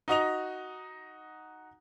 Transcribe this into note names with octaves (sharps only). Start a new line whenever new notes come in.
D#4 F#4 D#5 F7